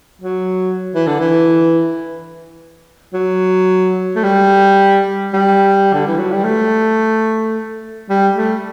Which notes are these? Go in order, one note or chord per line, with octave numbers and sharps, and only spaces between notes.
F#3
E3
D3
E3
F#3
A3
G3
G3
D3
E3
F#3
G3
A3
G3
A3